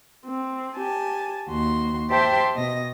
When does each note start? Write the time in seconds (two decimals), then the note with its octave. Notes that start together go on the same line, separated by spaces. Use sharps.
0.25 C4
0.76 G4 G#5 A5
1.49 D#2 F#4 C6
2.10 G4 C5 E5 G5 A5 C6
2.55 B2 D#5 A#6